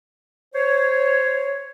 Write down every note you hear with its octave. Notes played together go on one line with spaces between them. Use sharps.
C5 C#5